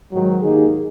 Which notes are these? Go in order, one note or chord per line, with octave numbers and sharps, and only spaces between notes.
G#2 D#3 F#3
D#2 D#3 A#3 D#4 G#4